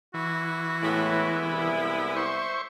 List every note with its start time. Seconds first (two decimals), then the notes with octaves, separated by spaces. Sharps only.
0.14 E3 F#4
0.83 A2 G#3 B3 E4
1.44 C2
2.16 C5 E5 C#6